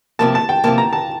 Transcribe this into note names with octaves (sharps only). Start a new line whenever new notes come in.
C3 F3 A#3 A5
A5
G5
C3 F3 A#3 A5
A#5
A5